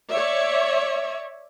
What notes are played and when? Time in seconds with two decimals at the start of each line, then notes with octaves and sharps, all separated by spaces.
0.10 C#5 D5 E5